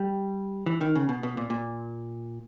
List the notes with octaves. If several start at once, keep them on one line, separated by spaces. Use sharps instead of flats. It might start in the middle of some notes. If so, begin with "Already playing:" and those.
Already playing: G3
E3
D#3
C#3
B2
B2
A#2
A#2